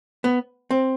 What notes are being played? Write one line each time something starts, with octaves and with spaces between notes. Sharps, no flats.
B3
C4